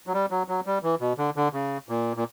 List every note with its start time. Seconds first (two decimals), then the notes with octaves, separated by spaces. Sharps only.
0.07 F#3
0.14 G3
0.31 F#3
0.48 F#3
0.66 G3
0.83 E3
1.01 B2
1.18 D3
1.36 D3
1.53 C#3
1.89 A#2
2.17 A#2